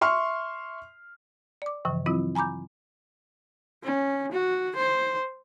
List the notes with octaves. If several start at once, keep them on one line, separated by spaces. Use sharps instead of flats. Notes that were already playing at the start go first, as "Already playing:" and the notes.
E5 C6 C#6 F6
D5 D6
G2 C#3 E3 F3
E3 F#3 C4 E4 F4
G#5 A#5 B5 D6 G6
C#4
F#4
C5